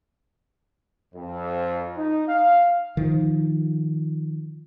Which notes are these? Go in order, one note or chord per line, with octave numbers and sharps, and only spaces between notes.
F2
D#4
F5
D#3 F3